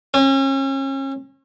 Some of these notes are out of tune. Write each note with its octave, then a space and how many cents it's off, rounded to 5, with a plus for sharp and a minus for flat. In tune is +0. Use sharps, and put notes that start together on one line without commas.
C#4 -35